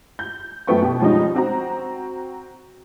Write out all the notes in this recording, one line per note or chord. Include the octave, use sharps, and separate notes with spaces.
G6
F#2 A3 B3 G5 C#6
B2 G4
F3 G3 G#3 C#4 D#4
C4 F#4 A#5